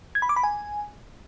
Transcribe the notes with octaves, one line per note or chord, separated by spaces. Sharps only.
G#6
B5
D6
B5
G#5